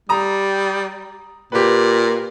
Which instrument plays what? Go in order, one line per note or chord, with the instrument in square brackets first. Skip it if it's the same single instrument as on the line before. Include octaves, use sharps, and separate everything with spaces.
[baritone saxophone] G3 [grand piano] A#5 D#6
[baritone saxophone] A#2 [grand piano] G4 B4